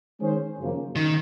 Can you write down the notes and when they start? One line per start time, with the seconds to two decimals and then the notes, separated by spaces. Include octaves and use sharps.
0.21 D#3 G#3 C#4 G#4 C5
0.59 F#2 C#3 F3 A#3
0.96 D#3